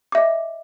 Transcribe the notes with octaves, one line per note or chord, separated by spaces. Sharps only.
D#5 E5 D6